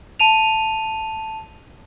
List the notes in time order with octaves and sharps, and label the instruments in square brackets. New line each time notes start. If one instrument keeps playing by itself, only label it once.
[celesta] A5 D#7 F7